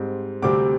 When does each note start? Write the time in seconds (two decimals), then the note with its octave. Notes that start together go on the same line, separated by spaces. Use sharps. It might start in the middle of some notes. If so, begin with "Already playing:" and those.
Already playing: G#2 G3 C4
0.42 D2 C3 G3 C4 D6